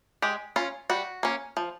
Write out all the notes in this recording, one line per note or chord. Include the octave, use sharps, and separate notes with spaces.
G#3 G4
C#4 F4
G3 F#4
A#3 C#4
F3